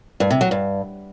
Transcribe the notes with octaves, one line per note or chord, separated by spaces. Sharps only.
G2
C3
F#3
G2